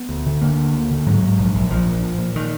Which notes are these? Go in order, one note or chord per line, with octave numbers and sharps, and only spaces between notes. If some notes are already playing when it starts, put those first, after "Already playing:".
Already playing: B3
D2
D3
D3 A#3
D2
D2
D3
G#2 F#3
G#2
A#1
A#1
A#1 F3
A#2
A#2
A#2
D#3